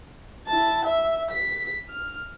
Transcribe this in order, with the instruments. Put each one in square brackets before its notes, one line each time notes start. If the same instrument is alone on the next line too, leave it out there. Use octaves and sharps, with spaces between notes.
[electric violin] E4 A5
E5
B6
F6